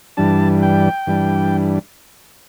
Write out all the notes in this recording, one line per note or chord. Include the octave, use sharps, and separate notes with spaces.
G2 E3 G3 D4 A5
G5
G2 E3 G3 D4